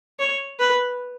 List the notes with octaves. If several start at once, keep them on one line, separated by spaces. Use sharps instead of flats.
C#5
B4